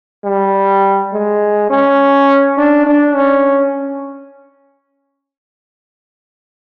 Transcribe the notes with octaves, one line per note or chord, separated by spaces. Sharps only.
G3
G#3
C#4
D4
D4
C#4